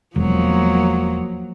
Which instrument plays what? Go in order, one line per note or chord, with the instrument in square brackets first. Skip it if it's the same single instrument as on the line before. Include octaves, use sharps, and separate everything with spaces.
[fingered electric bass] E1 [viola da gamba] F3 F#3 A#3